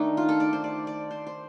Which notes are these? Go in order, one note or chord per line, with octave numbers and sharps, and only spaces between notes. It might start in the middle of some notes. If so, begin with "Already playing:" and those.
Already playing: D#3 A3 D4 D#4
F4
A4
D5
C5
D5
D5
C5
C5